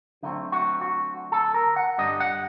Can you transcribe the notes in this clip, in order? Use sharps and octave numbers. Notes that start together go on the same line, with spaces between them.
D3 F#3 A3 C4 D#4
F#4
F#4
A4
A#4
F#5
G2 D3 G3 D4 D#5
F#5